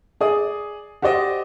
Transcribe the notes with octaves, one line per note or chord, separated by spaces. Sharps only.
G#4 D5 D#6
F#4 G4 C5 D5 D#5